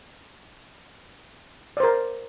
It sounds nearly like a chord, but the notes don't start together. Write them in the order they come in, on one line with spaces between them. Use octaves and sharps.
D5 C5 A#4